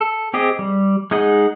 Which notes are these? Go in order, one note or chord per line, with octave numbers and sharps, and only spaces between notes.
A4
C4 G4 G#4 D#5
G3
G#3 D#4 G#4 D#5 F#5